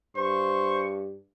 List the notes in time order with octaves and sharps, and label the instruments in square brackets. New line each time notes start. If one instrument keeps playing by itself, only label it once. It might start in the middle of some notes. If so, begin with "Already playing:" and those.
[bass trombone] G2 [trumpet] C5 [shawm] C#6